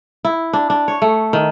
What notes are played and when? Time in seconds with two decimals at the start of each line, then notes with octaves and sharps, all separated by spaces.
0.25 E4
0.53 D4
0.70 D4
0.88 C#5
1.02 A3
1.33 D#3